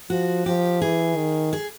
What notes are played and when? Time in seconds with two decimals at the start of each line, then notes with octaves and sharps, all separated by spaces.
0.10 F3 F#4
0.46 F3 G4
0.82 E3 G#4
1.16 D#3
1.53 G#4